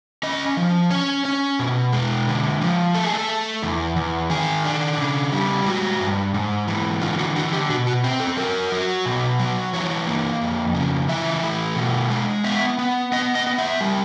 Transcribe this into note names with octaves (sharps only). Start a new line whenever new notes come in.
C#4 D#5
F3
C#4 C#5
C#4
B2
G#3
D3
F3
A3 A4
G#4
A4
A3
E2
E2
D#3 G#4
D4
C#3
G3
G#3 F#4
G2
G#2
E3
D3 F4
F#4
D3 F#4
G4
B2 F#4
F#4
C4
A4
F#3 A#4
F#3
B2
F#3
E3 C#5
A#3
F2
C#3
E3 E5
A3
B2
G#3
B3 E5
B3
B3 D#5
D#5
B3
E5
G3